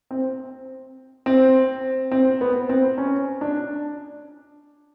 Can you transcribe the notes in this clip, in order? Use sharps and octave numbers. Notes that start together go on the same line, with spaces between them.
C4
C4
C4
B3
C4
C#4
D4